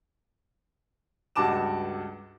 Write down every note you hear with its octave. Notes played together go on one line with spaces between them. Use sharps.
C#2 G2 F#4 A5 D6 E7